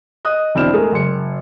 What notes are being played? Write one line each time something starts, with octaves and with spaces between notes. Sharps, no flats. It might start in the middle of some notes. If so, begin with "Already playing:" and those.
D#5 D#6 F#6
E1 C4 D4 E4 F6 E7
G#3 A3 G#4 A#4
F#1 C6 C#7